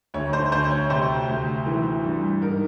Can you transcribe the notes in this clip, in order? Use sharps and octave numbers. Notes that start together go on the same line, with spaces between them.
D2 C#5
C5
D2 C5
C#5
C3 C5
D2
E3
G2
G#2 A#4